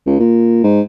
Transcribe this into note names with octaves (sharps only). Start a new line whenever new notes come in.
C#2
A#2
G#2